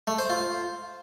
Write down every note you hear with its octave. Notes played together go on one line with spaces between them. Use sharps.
A3
C5
F4